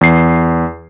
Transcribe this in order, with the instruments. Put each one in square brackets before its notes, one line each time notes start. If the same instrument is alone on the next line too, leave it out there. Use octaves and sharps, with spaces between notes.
[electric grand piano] E2 C7